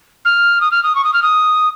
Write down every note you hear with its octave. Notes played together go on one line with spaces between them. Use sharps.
F6
D#6
F6
D#6
C#6
D#6
F6
D#6